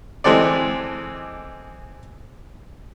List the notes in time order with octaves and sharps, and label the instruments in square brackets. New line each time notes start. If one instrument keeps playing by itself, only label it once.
[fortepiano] E3 G#3 C4 A4 D5